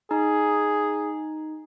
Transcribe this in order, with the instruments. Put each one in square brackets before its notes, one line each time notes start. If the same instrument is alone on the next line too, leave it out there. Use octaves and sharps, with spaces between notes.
[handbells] D#4 [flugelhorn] G#4